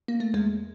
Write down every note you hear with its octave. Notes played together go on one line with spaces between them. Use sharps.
A#3
A3
E2 G#3